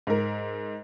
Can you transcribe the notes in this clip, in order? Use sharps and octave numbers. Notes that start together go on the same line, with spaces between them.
G#2 A#4